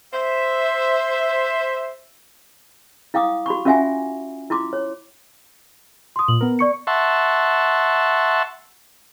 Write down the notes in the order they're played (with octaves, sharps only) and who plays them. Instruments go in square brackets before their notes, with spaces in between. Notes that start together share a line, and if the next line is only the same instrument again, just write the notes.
[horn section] C5 E5
[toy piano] E4 F5 G5 D6 D#6
F#4 B5 C#6
C#4 F4 F#4 E5 F#5 G#5
E4 F4 C6 D6
C#5
[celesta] C6 D#6
[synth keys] A#2 [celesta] F#7
[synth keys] B3 A#4
[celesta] D5 C#6 C#7
[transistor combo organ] E5 F#5 A5 C6 C#6